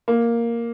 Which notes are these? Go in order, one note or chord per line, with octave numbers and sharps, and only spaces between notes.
A#3